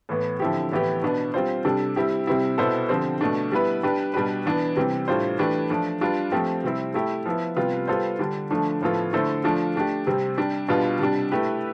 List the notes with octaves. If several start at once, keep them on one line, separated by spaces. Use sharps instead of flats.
A2 E3 B3
D3 F3 C4 E4 G4
A2 E3 B3 E4 G4
B2 B3 D4
G3 C4 F4 C5
C3 G3 D4 A4
G3 C4 E4 G4
C3 G3 C4 E4
B2 B3 E4 A4 C5
D3 F3 C4 G4 C5
B2 A3 D4
G3 B3 E4 B4
G3 D4 G4 B4
B2 G3 D4 G4 B4
E3 B3 D4
C3 E3 G3 C4 G4
A2 G3 D4 F4 C5
E3 A3 D4 G4 B4
F3 A3 D4
G3 D4 F4 B4
F3 A3 C4 G4
C3 G3 C4 E4
A3 E4 G4
F3 B3 E4
C3 G3 B3 F4 B4
G3 B3 F4 A4 C5
D3 G3 D4
D3 F3 A3 D4
A2 F3 B3 F4 A4
D3 A3 E4 A4 C5
F3 A3 D4 F4
A3 D4 G4
C3 G3 C4
G3 D4 G4
B2 G3 D4 F4 B4
C3 G3 D4
A3 E4 G4 B4